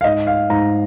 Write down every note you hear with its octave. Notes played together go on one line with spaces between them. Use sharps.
F5
G#2 D#5
F5
G#2 A#5